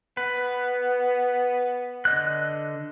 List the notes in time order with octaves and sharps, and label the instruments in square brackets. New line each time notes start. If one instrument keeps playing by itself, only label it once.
[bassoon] B3 [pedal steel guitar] B4
[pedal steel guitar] D3 D#5 F#6